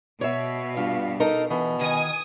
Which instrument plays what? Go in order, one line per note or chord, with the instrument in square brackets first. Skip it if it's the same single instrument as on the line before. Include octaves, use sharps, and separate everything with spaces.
[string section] B2 [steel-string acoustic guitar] C#5 E5
[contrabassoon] G2 [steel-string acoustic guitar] F4
[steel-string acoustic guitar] D#4 A4 A#4
[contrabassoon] B2 [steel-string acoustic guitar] E3
[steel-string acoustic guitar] D#3 [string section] G#5 D#6